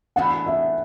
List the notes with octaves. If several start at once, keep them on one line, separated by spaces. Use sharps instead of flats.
A2 E3 B3 D4 F#4 F#5
E5